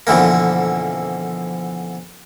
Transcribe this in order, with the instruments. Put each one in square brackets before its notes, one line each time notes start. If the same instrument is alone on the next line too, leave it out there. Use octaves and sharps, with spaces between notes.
[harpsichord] F2 B2 D3 E3 A#3